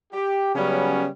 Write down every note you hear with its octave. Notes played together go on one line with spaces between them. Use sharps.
G4
C#3 F#3 G3 B3 C#4